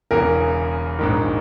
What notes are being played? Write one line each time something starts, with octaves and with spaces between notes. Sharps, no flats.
E1 E2 C#3 E3 A#4
A#1 G#2 D#3